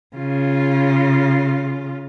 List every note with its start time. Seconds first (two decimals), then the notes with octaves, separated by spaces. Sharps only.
0.16 C#3 F4